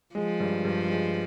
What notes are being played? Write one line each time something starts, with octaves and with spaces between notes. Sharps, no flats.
F3 G#3
G2
G2
G#3